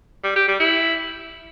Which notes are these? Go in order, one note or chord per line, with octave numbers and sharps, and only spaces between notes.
G3
G4
G3
E4